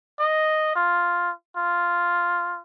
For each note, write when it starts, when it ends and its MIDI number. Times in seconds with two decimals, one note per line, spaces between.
0.19 0.75 75
0.75 1.32 65
1.57 2.61 65